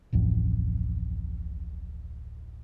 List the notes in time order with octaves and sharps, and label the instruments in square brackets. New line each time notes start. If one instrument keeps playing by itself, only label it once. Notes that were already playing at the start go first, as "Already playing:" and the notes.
[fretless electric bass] D1 A1 F2